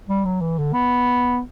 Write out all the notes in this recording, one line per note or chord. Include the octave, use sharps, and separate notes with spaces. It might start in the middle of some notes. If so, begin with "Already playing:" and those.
G3
F#3
E3
D3
B3